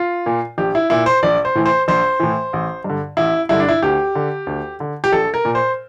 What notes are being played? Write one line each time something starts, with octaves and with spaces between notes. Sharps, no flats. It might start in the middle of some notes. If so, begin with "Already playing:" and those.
Already playing: F4
A#2
A#1 G4
E4
A#2 E4
C5
A#1 D5
C5
A2 E3
C5
A#1 C5
A2 E3
A1
G2 D3
A1 E4
G2 D3 E4
D4
E4
D2 G4
D3
D2
D3
G4
A#1 A4
A#4
A#2
C5